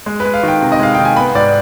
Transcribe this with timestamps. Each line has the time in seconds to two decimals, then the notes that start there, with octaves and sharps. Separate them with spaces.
0.06 G#3
0.20 B4
0.25 G#3
0.34 F5
0.43 D#3 G5
0.62 C3
0.72 D#5
0.80 G#3 F5
0.95 D#3 G5
1.05 G#5
1.16 B3 B5
1.35 G#2 D5